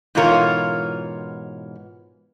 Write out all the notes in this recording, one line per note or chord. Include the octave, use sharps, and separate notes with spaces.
G#2 B2 E3 F4 A#4 C#5